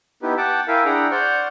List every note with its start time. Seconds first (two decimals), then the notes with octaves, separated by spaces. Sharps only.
0.22 B3 D#4 E4 G4 B4
0.37 F#5 G5 A5 D6
0.68 E4 A#4 E5 F5 G5 G#5
0.85 D4 E4 G#4 F#5 G5 A#5
1.11 C5 D5 F#5 C#6 F6 G6